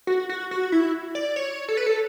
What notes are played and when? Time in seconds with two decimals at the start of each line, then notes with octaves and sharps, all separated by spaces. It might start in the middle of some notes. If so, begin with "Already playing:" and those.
0.07 F#4
0.29 F#4
0.51 F#4
0.72 E4
1.15 D5
1.36 C#5
1.68 A4
1.77 B4
1.86 A4